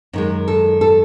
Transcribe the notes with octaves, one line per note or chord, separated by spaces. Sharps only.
F#2 D#3 G#3 D#4
A4
A4